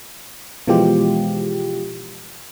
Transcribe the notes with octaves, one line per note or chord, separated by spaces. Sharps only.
B2 E3 F3 G#3 F4 G4